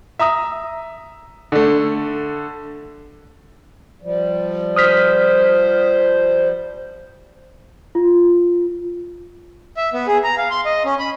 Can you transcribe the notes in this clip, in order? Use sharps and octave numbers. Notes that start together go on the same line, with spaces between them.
E5 A#5 D#6
D3 A3
F3 G3
C5 D#6 F6 B6
F4
E5
B3
G#4
A#5
F5
C6
D#5
C#4
B5